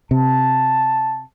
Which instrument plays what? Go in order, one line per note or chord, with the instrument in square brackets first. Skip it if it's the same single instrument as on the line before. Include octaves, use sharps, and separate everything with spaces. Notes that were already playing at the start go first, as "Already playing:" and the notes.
[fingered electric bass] C3 [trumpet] A5